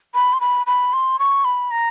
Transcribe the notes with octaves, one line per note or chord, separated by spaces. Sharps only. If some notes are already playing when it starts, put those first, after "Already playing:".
B5
C6
B5
B5
C6
C#6
B5
A#5